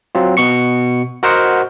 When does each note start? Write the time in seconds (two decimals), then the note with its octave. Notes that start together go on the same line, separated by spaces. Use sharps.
0.15 F#3 C4 F4
0.37 B2 B3 C#6 C#7
1.23 F#4 A#4 C5 D#5 F#5